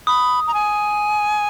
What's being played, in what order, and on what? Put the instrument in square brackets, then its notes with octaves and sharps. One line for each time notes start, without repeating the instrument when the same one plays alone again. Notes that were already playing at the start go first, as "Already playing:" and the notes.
[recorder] B5 [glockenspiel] D#6
[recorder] A#5
G#5